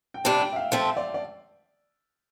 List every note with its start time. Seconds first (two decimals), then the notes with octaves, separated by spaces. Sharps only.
0.14 G5
0.24 C3 G3 D4 A5
0.40 G5
0.53 E5
0.56 F5
0.72 F3 A3 C4 E5
0.97 D5
1.14 D5